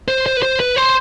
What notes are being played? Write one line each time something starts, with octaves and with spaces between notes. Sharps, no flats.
C5
C5
B4
C5
B4
C5